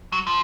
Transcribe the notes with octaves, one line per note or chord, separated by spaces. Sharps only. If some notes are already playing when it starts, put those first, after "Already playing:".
F#3
F3